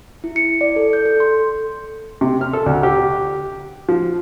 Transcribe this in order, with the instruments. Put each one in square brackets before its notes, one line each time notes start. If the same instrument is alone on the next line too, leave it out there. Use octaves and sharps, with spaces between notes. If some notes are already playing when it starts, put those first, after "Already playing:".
[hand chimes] E4
C#7
D5
A4
G6
A4
C6
[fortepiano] C3
F6
A4
D2
G4
F3